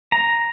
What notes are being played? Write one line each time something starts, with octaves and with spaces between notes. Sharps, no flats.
A#5